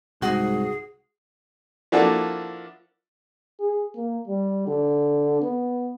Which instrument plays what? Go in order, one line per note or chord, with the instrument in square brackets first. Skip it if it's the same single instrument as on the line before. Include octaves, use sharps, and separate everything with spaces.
[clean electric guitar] C2 [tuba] G#2 [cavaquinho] F#4 [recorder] G#4
[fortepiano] F3 A#3 D4 E4 F#4 A4
[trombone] G#4
A#3
G3
D3
B3